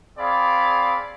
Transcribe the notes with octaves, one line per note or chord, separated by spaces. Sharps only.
C4 G#4 D5 F5 B5